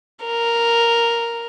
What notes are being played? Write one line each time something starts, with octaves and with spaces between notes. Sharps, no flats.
A#4